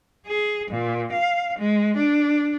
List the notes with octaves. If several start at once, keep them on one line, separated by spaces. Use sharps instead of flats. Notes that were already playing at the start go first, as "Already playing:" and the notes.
G#4
A#2
F5
G#3
D4